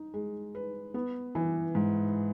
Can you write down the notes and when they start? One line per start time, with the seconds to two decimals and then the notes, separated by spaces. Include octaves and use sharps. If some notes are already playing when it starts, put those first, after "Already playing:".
Already playing: D#4
0.14 G#3
0.55 B4
0.94 B3
1.35 E3
1.75 G#2